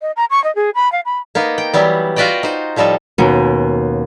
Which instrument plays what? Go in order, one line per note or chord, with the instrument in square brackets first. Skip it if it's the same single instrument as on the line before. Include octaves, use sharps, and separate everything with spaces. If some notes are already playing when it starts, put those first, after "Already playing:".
[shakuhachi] D#5
A#5
C#6
D#5
G#4
B5
F5
B5
[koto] A#3 B3 D#4
G5
E3 F#3 G3 B3
F4 F#4 B4 D5 D#5 G5
D#4 C5
A2 F3 G3 D#4 A4
[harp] D#2 B2 C#4